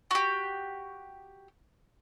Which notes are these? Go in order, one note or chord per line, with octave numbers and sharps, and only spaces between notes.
F#4 G4